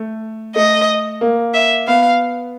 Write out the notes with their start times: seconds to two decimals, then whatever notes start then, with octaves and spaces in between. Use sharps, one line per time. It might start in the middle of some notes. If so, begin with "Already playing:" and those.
Already playing: A3
0.56 A3 D#5
1.21 A#3
1.54 E5
1.87 B3 F5